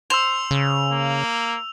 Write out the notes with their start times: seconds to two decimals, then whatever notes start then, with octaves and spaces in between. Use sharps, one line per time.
0.10 C5 E6 F7
0.51 C#3
0.92 A#3